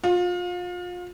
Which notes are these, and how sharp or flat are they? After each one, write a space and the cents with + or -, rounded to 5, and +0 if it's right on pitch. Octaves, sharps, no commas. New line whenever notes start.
F4 +30